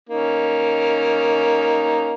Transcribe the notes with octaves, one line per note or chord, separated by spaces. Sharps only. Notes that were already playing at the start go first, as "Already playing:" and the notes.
A#3 C#4 D#4